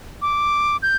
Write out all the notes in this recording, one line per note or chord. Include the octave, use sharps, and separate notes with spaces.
D6
G6